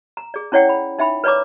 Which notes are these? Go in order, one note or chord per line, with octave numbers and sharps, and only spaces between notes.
A#5
G#4 D5
C#4 E4 C#5 D5 F#5 G5
B5
D#4 E5 G5 B5
B4 C#5 D5 A#5 D6